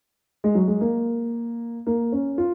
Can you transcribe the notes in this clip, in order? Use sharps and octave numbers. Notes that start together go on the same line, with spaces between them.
G#3
F#3
G#3
A#3
A#3
C#4
F4